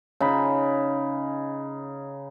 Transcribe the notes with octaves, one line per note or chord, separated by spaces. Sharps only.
C#3 D#4 B5